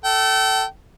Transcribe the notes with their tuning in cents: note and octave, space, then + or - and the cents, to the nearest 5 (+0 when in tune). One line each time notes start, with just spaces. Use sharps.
A4 +0 G5 -35